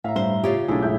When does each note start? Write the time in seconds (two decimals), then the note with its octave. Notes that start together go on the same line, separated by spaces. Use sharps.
0.04 A2 E5 F5 A#5
0.16 G2 C5 G7
0.44 C#3 F4 G4 C#5 D#6 G#6 A6
0.68 B1 A2 D4 E4 G#4
0.82 G#2 D4 E4 G6